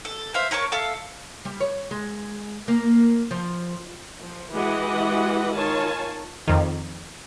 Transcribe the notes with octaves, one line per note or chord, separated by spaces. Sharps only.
A4
C5 E5 F5
A#4 C#5 A5 C#6
A4 E5 F5 A5
G3
C#5
G#3
A#3
F3
F3
E3 G#3 F#4 G4 D#5 F#5
D#3 F4 C#5 G#5 A5
F2 D#3